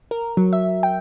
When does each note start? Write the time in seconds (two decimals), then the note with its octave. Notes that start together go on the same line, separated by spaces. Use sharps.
0.11 A#4
0.37 F#3
0.53 E5
0.83 G5